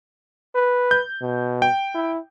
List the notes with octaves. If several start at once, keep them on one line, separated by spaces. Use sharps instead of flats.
B4
G6
B2
G5
E4